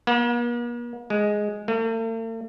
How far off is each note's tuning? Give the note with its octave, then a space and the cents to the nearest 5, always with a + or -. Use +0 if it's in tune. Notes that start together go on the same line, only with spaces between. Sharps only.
A#3 +45
G#3 +5
A3 +45